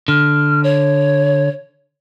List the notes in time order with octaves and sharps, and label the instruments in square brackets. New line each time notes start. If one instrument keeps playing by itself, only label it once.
[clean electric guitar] D3 [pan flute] F6
[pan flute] C#5